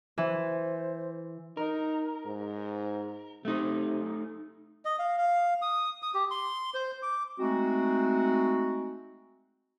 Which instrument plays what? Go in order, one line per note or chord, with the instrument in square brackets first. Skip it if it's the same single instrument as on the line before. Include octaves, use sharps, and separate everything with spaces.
[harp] E3 [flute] C5
[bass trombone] D#4 [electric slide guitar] A#4
[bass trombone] G#2
[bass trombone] C3 [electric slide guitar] A3 D#4
[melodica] D#5
F5
F5
D#6
D#6
G4
C6
C5
D6
[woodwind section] G#3 A3 C4 D#4 F#4